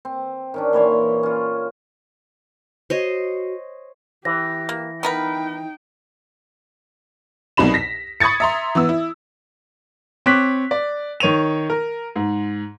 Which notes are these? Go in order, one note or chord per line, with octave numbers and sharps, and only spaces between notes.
C4
D#3 C#4 D4
A#2 E3 C#5 C6
C#4 F4
F#4 C5 C#5 D#5
E3 G4 A#6
A#3
B3 D#4 A#4 B4 G5
C2 B2 F#3 D#4 B5 E7
A#6 B6
B5 C#6 D#6 G#6 A6 C#7
E5 A#5 C6
E3 B3 E6
E4
C4 C#5 D6 F#6 B6
D5
D#3 C#5 D#7 F7
A#4
G#2